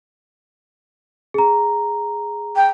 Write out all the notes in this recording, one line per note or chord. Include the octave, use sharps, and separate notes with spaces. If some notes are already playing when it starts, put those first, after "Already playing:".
G#4 A#5
G5